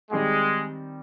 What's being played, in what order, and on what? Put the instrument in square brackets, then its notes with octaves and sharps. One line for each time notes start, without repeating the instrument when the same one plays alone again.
[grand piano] D#3 G3 C4 D#4 G4 [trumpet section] G#3